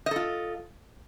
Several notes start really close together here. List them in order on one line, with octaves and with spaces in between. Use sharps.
D#5 A4 F4